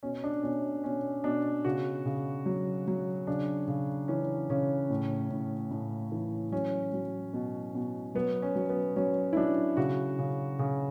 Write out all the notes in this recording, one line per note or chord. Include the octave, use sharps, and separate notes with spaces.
B2 C#4
D4
B2 C#4
B2 C#4
B2 D4
C#3 F#4
C#3
F#3
F#3
C#3 D4
C#3
E3 C#4
C#3 C#4
A2
A2
A2
E3
F#3 C#4
F#3
B2
B2
F#3 B3
C#4
F#3
B3
F#3 C#4
E4
F#3 D4
C#3 F#4
C#3
C#3